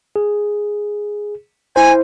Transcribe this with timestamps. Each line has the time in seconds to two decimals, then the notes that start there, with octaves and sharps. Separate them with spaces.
0.16 G#4
1.76 E4 C5 G#5